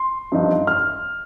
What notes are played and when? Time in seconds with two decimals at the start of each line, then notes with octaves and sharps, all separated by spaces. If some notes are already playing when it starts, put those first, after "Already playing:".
Already playing: C6
0.32 G2 F3 C4 D#4
0.67 F6